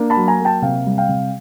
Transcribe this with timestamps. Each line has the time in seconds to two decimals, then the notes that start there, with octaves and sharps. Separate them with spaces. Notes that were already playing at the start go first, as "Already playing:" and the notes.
Already playing: A#3 D4
0.10 A5 B5
0.17 F#3
0.28 G#5 A#5
0.40 A#3
0.45 G5 A5
0.62 C3 F5 G5
0.86 G3
0.98 F5 G5
1.09 C3